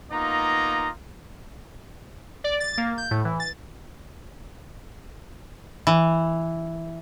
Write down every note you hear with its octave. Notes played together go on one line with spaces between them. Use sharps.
A#3 B3 D#4 F4 D#5 A#5
D5
A6
A#3
G6
A2
E3
A6
E3